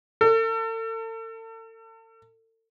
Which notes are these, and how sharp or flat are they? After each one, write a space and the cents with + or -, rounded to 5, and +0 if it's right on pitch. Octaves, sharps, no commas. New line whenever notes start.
A4 +40